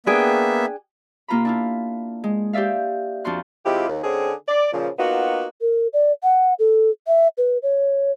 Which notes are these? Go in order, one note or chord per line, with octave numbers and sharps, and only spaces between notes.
A#3 B3 D4 G#4 E5 G5
C3 A#3 F4 A#5 B5
D4 E4 F4
G#3
G4 C5 D5 E5 F5
F2 F3 D4 F#4 C6 F#6
C3 F3 G#3 E4 F4 G4
D#2
D3 C4 C#4 G#4
D5
A#2 C#3 F3
A#3 B3 D#4 F4 F#4
A#4
D5
F#5
A4
E5
B4
C#5